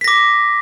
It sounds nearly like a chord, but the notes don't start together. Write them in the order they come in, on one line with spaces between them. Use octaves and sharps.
B6 A#6 D6